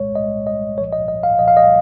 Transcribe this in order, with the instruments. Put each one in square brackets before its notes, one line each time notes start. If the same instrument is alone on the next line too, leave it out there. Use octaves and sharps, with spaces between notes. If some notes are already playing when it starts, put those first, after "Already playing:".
Already playing: [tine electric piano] C2 A#2 G#3 C#5
C2 A#2 G#3 D#5
D#5
C2 A#2 F3 C#5
D#5
D#5
F5
C2 A#2 F3 D#5
F5
D#5